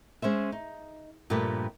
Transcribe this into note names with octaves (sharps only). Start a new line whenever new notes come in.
G#3 C#4 C5 E5
D#4
G2 A#2 F3 A3 G4 B4